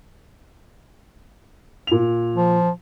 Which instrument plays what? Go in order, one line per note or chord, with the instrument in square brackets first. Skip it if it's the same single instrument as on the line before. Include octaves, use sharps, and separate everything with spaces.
[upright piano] A#2 F7
[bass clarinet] F3